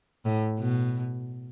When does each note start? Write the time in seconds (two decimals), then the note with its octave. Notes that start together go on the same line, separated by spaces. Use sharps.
0.25 A2
0.58 B2